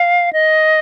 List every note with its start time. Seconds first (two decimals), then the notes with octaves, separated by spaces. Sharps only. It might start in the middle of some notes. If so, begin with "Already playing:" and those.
Already playing: F5
0.33 D#5